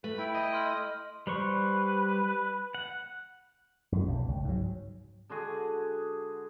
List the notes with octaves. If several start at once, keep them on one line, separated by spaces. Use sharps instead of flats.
A3 B4
E4 G5 B5
D#5
C6 F6 F#7
G3 B4 C5 C#6
F#5
F#2
B1
C#2
G#2 F#3
D3 G#3 F#4 G#4